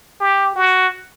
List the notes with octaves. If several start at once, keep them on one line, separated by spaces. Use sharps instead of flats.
G4
F#4